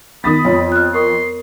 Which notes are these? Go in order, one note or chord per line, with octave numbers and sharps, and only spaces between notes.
D#3 B3 B5 D#6 A6
F2 C#5
F6 F#6
A#4 C6 C#6 D#6